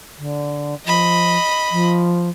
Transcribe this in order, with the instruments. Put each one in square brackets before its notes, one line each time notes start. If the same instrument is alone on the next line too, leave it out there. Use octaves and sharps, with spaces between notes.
[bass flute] D3
[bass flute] F3 [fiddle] D#5 B5
[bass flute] F3